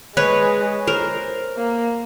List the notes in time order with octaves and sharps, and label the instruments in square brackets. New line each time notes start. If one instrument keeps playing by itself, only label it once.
[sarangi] G#3 [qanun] B4 C#5
[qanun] A#4 C5
[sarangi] A#3